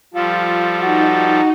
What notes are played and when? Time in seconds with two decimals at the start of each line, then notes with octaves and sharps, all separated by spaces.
0.14 F3 G3 F4 A4
0.82 D#4 F#4